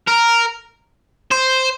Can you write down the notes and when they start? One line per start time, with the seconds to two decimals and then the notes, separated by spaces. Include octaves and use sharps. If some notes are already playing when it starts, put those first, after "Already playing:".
0.08 A#4
1.32 C5